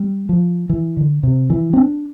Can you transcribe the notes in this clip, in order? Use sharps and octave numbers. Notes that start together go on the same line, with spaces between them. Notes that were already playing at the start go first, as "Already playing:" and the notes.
Already playing: G3
F3
E3
D3
C3
E3
C4
D4